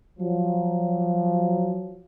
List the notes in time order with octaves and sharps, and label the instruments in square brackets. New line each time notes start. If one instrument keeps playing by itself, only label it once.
[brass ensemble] F3 F#3